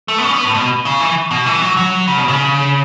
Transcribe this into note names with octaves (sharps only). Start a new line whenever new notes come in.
A3
B3
C#4
B3
A2
B2
C#3
E3
B2
E3
F#3
F#3
C#3
B2
C#3